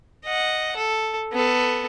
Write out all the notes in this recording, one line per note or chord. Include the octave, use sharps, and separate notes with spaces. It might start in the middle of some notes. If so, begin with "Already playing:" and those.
D#5 F#5
A4
B3 A4